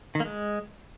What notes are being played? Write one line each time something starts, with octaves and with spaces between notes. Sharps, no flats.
D#3
A#3
G#3